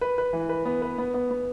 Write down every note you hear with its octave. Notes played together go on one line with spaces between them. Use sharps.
B4
B4
E3
B4
B3
B4
B3
B3
B3